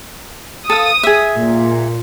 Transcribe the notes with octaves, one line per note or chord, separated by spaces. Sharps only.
A4 F5 D#6
G#4 E5
A#2